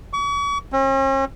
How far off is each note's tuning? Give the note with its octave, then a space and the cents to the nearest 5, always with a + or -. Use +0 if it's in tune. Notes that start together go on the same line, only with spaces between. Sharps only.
C#6 +40
C#4 -45